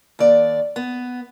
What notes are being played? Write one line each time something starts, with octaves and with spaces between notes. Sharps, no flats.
D#2 D5
B3